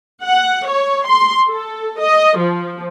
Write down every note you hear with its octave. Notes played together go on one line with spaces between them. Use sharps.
F#5
C#5
C6
A4
D#5
F3